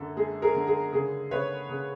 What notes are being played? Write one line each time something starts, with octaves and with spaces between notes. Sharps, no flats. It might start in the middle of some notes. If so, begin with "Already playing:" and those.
Already playing: F#2 D3 A4
G#3 G#4
G#4 A#4
D3
G#4
C#3 G#4
C#3 B4 C#5
C#3